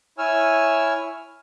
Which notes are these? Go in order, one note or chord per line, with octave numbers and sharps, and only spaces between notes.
E4 C#5 G#5 E6 F6